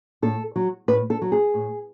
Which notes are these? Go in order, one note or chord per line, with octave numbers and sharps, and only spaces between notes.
A2 A4
F#3
A2 B4
A4
F#3
G#4
A2